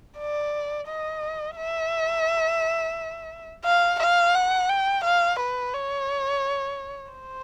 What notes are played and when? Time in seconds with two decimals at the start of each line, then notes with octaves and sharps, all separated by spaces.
0.18 D5
0.87 D#5
1.56 E5
3.65 F5
4.00 F5
4.35 F#5
4.70 G5
5.04 F5
5.40 B4
5.74 C#5
7.12 C5